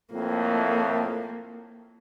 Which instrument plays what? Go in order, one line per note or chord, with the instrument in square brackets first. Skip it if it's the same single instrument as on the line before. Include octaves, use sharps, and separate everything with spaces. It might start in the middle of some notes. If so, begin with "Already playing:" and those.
[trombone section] F2 A2 [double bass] A#3